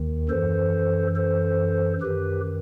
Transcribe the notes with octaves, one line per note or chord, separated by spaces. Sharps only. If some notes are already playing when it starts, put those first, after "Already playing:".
Already playing: D#2 D#3
F#2 E3 A4 C5
A4 C5
F#2 D#3 G4 B4